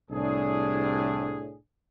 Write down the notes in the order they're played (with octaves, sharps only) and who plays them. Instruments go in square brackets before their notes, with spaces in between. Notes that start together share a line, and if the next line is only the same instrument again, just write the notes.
[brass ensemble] C2 A2 D4 G#4